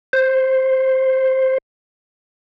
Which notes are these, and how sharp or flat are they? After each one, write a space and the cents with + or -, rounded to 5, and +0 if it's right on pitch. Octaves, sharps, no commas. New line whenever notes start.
C5 +5